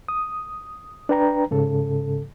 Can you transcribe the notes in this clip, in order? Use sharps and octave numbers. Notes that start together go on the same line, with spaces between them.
D#6
D4 B4 G5 A#5
G#2 C#3 A4